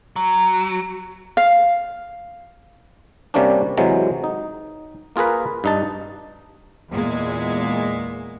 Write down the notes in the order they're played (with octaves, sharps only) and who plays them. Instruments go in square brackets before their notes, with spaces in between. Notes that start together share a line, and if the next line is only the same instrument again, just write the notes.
[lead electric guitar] F#3
[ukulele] F5
[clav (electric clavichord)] C3 G3 A#3 C#4 D4
C3 E3 F#3 G#3
D#4
A#3 F4 G#4 A#4 B4
G2 D#4 A5
[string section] E2 A#2 G#3